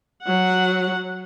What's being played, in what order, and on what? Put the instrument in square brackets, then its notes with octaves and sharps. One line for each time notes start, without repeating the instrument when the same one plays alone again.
[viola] F#3 F#5